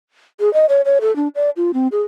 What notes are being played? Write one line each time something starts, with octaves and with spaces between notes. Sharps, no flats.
G#4
D#5
C#5
C#5
A4
D4
D5
F4
C4
G#4